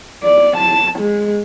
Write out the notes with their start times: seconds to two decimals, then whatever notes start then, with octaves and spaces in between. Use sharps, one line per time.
0.24 D5
0.57 A5
0.99 G#3